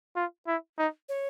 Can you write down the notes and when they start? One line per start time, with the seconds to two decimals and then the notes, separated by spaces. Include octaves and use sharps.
0.16 F4
0.48 E4
0.78 D#4
1.09 C#5